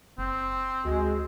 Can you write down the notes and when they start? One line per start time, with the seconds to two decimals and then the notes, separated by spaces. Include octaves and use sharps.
0.18 F#1 C4
0.85 D2 G#3 F#4